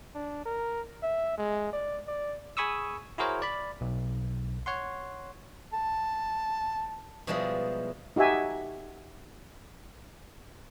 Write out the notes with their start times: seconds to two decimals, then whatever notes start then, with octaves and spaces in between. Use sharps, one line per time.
0.15 D4
0.45 A#4
1.03 E5
1.38 G#3
1.73 D5
2.07 D5
2.57 G#4 G#5 B5 C#6 D#6 E6
3.18 E4 F#4 G#4 A#4 C5 C#5
3.42 D5 B5
3.81 B1
4.66 C#5 F#5 C6
5.73 A5
7.27 B2 F3 G3 G#3 E4 D#5
8.16 D#4 F#4 G4 E5 G#5